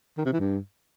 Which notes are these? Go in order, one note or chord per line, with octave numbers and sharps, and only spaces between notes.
D#3
C3
E3
G2